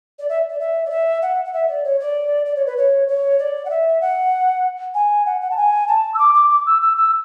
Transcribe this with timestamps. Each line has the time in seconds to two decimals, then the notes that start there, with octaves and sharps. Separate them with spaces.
0.19 D5
0.29 E5
0.50 D5
0.60 E5
0.85 D5
0.90 E5
1.22 F#5
1.45 F#5
1.53 E5
1.68 D5
1.84 C#5
2.00 D5
2.45 D5
2.56 C#5
2.66 B4
2.78 C#5
3.08 C#5
3.39 D5
3.65 F#5
3.70 E5
4.01 F#5
4.95 G#5
5.26 F#5
5.41 F#5
5.51 A5
5.57 G#5
5.88 A5
6.14 E6
6.19 D6
6.34 D6
6.50 D6
6.66 E6
6.82 E6
6.97 E6